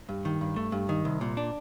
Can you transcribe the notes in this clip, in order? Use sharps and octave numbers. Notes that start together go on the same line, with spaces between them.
G2
D#3
G2
A3
G2
D#3
C2
A#2
D4